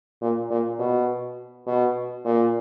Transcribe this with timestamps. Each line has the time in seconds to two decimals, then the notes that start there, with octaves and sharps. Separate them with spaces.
0.21 A#2
0.50 A#2
0.79 B2
1.67 B2
2.25 A#2